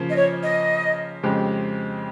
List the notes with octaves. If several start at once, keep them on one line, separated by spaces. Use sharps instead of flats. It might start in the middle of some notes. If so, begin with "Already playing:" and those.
Already playing: C#3 F3 A#3
D#5
C#5
D#5
F2 C#3 G#3 C4 G4